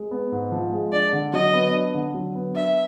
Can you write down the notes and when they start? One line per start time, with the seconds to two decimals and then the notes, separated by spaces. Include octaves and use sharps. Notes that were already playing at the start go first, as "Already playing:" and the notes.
Already playing: G#3
0.11 B3
0.32 G#2
0.52 F3
0.72 G#3
0.92 D4 D5
1.13 D3
1.33 F#3 D#5
1.54 B3
1.73 D4
1.94 D3
2.14 F#3
2.35 B3
2.55 D4 E5